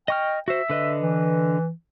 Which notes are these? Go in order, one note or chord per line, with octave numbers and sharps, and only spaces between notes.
D#5 G5 C#6 F6
F#4 C5 E5
D3 B4 D#5
E3